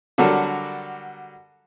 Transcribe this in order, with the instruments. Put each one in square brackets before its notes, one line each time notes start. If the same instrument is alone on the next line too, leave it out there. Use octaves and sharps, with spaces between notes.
[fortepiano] D3 F#3 G3 F#4 A4 A#4